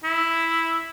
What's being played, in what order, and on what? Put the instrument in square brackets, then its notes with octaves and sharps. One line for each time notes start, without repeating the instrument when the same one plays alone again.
[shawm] E4